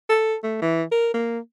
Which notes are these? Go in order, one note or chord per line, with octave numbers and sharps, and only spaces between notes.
A4
A3
E3
A#4
A#3